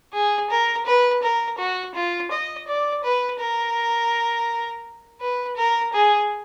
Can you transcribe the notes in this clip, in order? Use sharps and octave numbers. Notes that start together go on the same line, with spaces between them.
G#4
A#4
B4
A#4
F#4
F4
D#5
D5
B4
A#4
B4
A#4
G#4